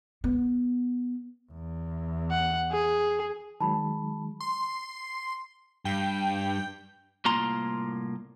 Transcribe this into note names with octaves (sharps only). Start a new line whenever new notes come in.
B3
E2
F#5
G#4
D#3 F#3 G#3 A5 B5
C6
G2 G5
C2 A2 A#3 F4 A#5 C6